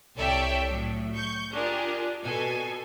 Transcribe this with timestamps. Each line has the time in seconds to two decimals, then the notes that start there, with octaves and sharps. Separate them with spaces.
0.16 C2 A4 C#5 D5 E5 G5
0.69 A2 F#3
1.14 C#6 G6
1.52 D4 F4 G4 G#4 A#4
2.24 B2 A4 G#5